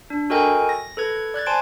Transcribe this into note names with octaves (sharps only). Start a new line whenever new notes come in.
D4
F#4 A4 A#4 D#5 G5 G#5
A#6
A4 B4 G#6
D5 F#6 G#6 A6
C5 G#5 A5 C6 D7